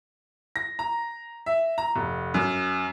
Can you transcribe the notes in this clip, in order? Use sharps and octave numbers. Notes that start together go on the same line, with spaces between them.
A#6
A#5
E5
A#5
F1
F#2